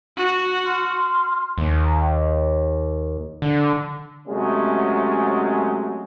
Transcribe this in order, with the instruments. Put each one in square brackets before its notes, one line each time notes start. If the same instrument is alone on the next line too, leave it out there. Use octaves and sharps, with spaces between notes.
[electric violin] F#4
[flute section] C6 F6
[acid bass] D#2
D3
[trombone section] C3 F#3 G#3 A3 C#4